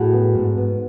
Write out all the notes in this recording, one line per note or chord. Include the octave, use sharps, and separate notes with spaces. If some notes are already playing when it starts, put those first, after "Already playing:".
Already playing: A2 F#4 G#4
B3
G#2
B3